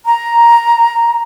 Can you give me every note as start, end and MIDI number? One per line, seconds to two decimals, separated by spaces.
0.06 1.22 82